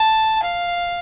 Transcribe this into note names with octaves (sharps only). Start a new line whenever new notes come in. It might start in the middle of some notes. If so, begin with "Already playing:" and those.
Already playing: A5
F5